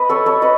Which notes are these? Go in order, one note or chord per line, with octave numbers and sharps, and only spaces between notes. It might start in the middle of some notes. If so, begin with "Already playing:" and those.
Already playing: B4 D#5
A4 C#5
A4 C#5
B4 D#5